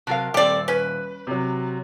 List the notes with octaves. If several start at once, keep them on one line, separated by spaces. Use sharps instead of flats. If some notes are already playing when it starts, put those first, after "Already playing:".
C3 F#3 A#4 F5 A5
D#1 A3 C4 G4 A4 D5 D7
C#4 B4
C3 F#3